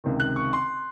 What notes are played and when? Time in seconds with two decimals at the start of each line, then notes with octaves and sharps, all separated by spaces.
0.04 C#2 C3 D#3
0.20 F#6
0.36 C#6
0.53 C6